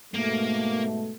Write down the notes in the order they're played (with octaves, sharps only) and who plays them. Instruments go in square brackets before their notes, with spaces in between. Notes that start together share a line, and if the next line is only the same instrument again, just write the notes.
[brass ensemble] G#2 B2 A3 [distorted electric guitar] A#3